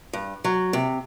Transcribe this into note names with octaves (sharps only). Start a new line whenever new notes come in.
G2
F#3
C3